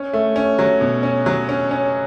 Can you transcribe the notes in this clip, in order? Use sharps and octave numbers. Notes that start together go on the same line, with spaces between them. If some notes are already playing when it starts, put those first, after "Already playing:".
Already playing: C#4
A3
C#4
F#3
B2
C#4
F#3
C#4
C#4